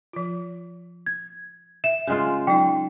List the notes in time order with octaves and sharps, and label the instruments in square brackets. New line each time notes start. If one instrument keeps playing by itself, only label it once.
[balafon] F3 F4
[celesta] G#6
[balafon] E5 [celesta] E7
[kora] C#3 G#3 F4
[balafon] F#3 D#4 [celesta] G5